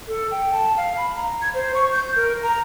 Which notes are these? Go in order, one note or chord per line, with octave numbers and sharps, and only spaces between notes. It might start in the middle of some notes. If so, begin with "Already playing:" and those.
A4
G5
A5
F5
B5
A#5
G#6
C5
C#6
G6
A#4
A#5